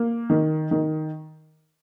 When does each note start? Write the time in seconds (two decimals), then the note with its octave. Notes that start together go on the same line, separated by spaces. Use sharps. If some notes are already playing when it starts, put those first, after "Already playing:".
Already playing: A#3
0.30 D#3
0.71 D#3